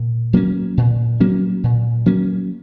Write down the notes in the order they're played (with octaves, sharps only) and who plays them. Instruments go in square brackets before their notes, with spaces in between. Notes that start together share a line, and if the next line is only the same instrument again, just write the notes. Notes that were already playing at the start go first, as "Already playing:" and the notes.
Already playing: [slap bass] A#2
F#3 A#3 C#4
A#2
F#3 A#3 C#4
A#2
F#3 A#3 C#4